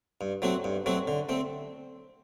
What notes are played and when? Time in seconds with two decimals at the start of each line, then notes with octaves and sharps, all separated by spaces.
0.21 G2
0.42 F#3 A3 C4 F#4
0.64 G2
0.86 F#3 A3 C4 F#4
1.08 D3
1.29 A3 C4